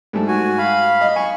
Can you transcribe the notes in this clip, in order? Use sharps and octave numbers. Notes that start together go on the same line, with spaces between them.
G#2 G3 A3
F#4 G#5
F5 B5
D#5
G#5 C#6